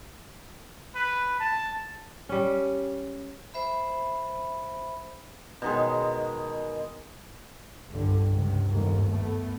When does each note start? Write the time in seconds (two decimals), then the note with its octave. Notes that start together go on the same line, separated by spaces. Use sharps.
0.95 B4
1.40 A5
2.29 G3 C#4
3.54 C5 E5 B5
5.62 B2 D#3 G#3
7.90 G1 C2 G2 D3
8.33 C#2 G2 C3
8.68 G1 D#2 G#2
9.09 A3 B3